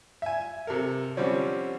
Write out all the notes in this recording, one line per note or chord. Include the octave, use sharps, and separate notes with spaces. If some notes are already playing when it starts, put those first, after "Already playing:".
E5 G#5
C3 A4 A#4
D3 F3 G3 C4 C#4